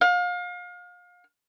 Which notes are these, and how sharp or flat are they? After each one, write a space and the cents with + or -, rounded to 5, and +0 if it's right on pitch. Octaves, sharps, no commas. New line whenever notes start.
F5 +35